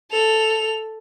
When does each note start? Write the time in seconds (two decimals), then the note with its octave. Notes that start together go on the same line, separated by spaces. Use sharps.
0.11 A4 F7